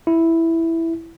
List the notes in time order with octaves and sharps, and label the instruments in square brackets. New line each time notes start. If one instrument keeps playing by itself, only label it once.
[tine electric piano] E4